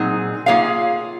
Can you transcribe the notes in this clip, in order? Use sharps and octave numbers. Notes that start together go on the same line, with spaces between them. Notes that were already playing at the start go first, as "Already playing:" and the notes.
Already playing: A#2 F#3 C4 D#4 G#4
A#3 F4 G#4 C#5 F5